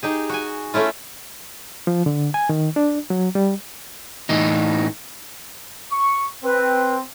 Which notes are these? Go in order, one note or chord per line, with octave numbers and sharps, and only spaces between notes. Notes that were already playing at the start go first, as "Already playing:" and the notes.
D#4 G4 G#4
F#4 G#5
A3 C#4 E4 F4
F3
D3
G#5
D#3
D4
F#3
G3
A2 E3 D#4
C#6
C4 B4